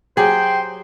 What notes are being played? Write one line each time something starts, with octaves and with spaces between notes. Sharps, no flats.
F#3 G4 G#4 C5 G5